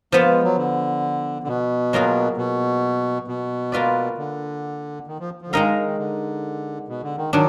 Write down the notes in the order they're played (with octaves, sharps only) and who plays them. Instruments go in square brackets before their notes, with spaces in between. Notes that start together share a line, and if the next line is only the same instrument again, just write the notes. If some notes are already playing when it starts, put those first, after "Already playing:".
[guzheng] F3 B3 F4 [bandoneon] A#3
[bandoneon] G#3
F#3
D3
D3
B2
[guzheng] F#3 A#3 F4 G#4
[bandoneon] B2
B2
[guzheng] A#3 F4 B4 D5
[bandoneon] D3
D#3
F3
F3
D3
[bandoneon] D#3 [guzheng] G#3 D#4 A#4 F5
[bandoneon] D#3
D3
B2
D3
D#3
[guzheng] D#3 D4 [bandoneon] F#3